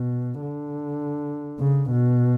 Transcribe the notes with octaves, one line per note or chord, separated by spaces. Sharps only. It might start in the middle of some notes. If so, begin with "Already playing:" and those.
Already playing: B2
D3
C#3
B2